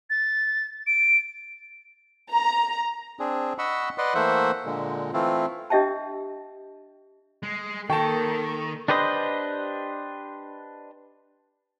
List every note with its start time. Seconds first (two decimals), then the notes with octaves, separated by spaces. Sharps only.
0.10 A6
0.87 D7
2.31 A#5
3.19 C4 D4 G#4
3.58 D#5 F#5 B5 C#6 E6
3.98 B4 D5 D#5 F#5 C6
4.15 E3 A3 A#3 C5 E5 F#5
4.65 A#2 D3 G#3
5.13 E3 A3 C4 E4 F4
5.70 D4 G4 D#5 E5 G5 A5
7.43 G#3
7.90 D#3 A#3 A4 G5 A5 C#6
8.88 D4 G4 B4 C5 D#5